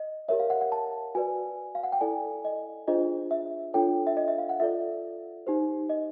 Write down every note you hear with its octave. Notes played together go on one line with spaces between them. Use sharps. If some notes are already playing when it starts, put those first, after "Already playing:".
Already playing: D#5
G4 A#4 C#5 E5
F5
F#5
F#5
A5
F#4 B4 D5 G#5
F5
F#5
G5
E4 A4 D5 G#5
D#5
D4 F4 G#4 C5 D#5
E5
D4 F4 A4 C#5 G5
E5
D#5
E5
F5
F#5
F4 A4 D5 E5
D#4 G4 C5
D#5